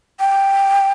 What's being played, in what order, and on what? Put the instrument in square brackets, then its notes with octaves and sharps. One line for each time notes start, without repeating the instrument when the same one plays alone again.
[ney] G5